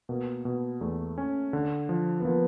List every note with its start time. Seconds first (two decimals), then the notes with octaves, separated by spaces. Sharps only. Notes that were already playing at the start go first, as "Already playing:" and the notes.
0.09 B2 A#3
0.45 B2
0.81 E2 A3
1.18 C#4
1.53 D3
1.89 F3
2.20 B3
2.25 F3 A#3